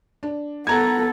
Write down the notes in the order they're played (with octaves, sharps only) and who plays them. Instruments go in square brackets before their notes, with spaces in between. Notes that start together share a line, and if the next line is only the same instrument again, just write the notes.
[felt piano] D4
[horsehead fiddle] B3 A4 [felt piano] F#5 A#5 G#6